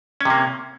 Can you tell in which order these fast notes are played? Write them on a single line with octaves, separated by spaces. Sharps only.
C#4 C3 A#3